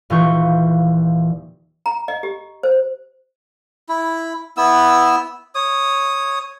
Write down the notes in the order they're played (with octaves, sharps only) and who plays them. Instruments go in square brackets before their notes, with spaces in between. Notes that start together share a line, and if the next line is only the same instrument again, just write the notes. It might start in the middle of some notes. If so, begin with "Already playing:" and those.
[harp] D#1 E3 F4 C#6 G6
[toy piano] A#5
D#5
G4
C5
[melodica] E4
B3 E4 E6
C#5 D#6